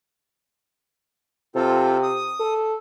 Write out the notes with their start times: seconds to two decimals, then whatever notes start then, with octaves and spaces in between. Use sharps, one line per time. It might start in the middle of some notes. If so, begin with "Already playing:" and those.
1.55 C3 C4 F4 A4
2.03 D#6
2.40 A4